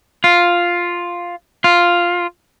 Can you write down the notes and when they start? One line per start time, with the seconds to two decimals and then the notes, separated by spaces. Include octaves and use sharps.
0.24 F4
1.64 F4